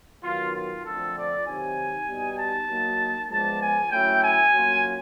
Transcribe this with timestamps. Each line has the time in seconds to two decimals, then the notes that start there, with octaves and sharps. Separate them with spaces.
0.23 D#3 F#3 B3 F4
0.53 F4
0.84 D3 F3 A3 C4 A4
1.16 D5
1.45 C3 D#3 F#3 G#5
2.07 B2 G3 B3 D#4
2.37 A5
2.68 F#3 A#3 D#4
3.29 F3 G#3 B3 D4 A5
3.61 G#5
3.91 F#3 A3 C#4 E4 G5
4.22 G#5
4.52 F#3 A#3 C#4 F4